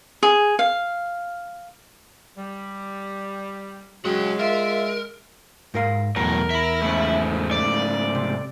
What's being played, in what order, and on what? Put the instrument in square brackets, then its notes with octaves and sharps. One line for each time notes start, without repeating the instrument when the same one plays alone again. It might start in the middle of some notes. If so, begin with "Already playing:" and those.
[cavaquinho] G#4
F5
[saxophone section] G3
[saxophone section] C#3 F#3 [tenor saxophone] G#3 [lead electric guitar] F#4 G5
[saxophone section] F4 E5 [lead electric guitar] A#4
[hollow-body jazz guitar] G#2 A#4 F5
[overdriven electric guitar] B1 A2 [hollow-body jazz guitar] E2 [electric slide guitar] A#4
[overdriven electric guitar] E5 B5
[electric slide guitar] G#2 C#3 A3
[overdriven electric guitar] D5
[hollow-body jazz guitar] C3